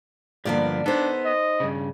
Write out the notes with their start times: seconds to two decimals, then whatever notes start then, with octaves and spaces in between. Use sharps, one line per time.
0.45 G2 D3 F3 A#3 B3 D5
0.86 B3 D4 D#4 A4 C5
1.25 D#5
1.60 G2 C#3